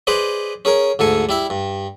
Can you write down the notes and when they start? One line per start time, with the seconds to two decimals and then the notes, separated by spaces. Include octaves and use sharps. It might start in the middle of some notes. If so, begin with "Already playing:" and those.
0.07 G#4 B4 C5 D5 D#5
0.65 C#4 G#4 A#4
0.99 D2 G#2 A4 G#5
1.29 G3 E4 E5
1.50 G2